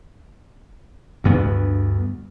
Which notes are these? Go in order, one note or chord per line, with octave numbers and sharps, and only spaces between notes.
D2 G2 B3